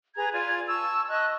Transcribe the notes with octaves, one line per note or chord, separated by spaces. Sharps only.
G#4 B4 A#5 G#6
F4 D5 G#5 G#6
A5 C#6 E6
D#5 A5 C#6 F#6